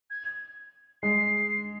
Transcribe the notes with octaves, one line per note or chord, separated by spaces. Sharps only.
G#6
G#3 C7